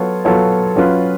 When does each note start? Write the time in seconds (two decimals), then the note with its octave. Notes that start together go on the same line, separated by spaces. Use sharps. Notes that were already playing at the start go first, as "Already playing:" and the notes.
Already playing: F#3 B3 F4 A4 C#5
0.25 F#3 B3 F4 A4 C#5
0.76 F#3 C#4 F4 B4